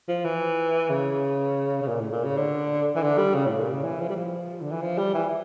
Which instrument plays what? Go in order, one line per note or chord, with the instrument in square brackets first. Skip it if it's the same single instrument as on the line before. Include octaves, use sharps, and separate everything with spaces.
[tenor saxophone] F3
E3
C#3
C#3
A#2
A2
A#2
C#3
D3
E3
D3
G3
C#3
A2
A#2
C#3
E3
F3
G3
F3
D3
E3
F3
G3
E3